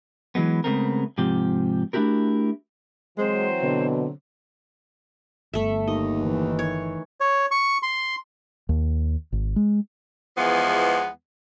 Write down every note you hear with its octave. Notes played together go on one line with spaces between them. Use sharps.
E3 F#3 G#3 B3
C#3 G#3 A3 B3 C4 A#4
G#2 C3 F3 G4
A3 D4 E4 F#4 G4 A#4
E3 F#3 G#3 C4 C5
B2 D3
G1 A3 E5
D#2 D#5
D#3 E3
C#5
C#5
C#6
C6
D#2
G#1
G#3
E2 E3 F3 G#3 B3